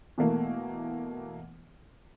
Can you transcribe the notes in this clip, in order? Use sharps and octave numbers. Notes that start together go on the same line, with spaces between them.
B2 E3 A3 A#3